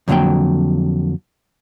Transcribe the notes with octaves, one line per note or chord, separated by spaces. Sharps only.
F2 B2 D3 F#3 A#3 G5